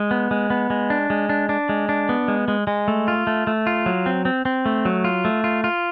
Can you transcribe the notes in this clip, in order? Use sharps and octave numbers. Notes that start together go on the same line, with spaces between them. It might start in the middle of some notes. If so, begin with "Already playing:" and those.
Already playing: G#3
B3
G#3
B3
G#3
D4
G#3
D4
D4
G#3
D4
B3
G#3
G#3
G#3
A3
F4
A3
A3
F4
F#3
C4
C4
C4
A3
F#3
F4
A3
F4
F4